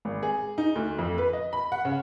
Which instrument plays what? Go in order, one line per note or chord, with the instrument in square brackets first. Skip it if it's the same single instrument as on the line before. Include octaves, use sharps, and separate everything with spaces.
[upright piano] G#1
G#4
D#4
D2
F2
B4
D#5
B5
F#5
C#3